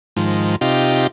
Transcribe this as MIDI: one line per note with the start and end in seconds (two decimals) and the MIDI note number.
0.17 0.56 44
0.17 0.56 51
0.17 0.56 53
0.61 1.07 48
0.61 1.07 63
0.61 1.07 65
0.61 1.07 67